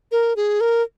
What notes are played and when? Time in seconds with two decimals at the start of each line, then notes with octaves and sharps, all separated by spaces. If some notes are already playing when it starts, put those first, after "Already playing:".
0.12 A#4
0.36 G#4
0.61 A#4